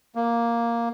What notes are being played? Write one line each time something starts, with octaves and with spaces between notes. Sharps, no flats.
A#3